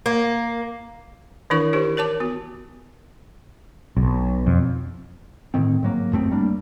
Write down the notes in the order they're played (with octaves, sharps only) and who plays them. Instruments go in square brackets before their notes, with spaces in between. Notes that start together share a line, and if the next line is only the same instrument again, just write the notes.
[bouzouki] A#3
[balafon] D#3 E3 D4 E4 A#4 C#6
D#4 E4 G4 A#4 C5
A#4 C#5 A5 D6
B3 F#4
[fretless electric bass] B1
F2
[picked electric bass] A2 D3 D#3 C4
G#2 F#3 A#3
G1 F#2 A3 C4
G3 A#3 D4